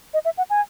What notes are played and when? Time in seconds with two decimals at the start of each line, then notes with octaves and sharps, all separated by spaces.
0.14 D#5
0.25 E5
0.38 F#5
0.50 G#5